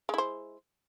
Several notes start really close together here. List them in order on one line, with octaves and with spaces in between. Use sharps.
G#3 E4 C5